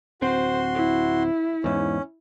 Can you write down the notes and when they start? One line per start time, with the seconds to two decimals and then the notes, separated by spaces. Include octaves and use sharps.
0.22 D1 C4 F#4 C5 C6
0.74 E4
1.64 E2 G#2 C#4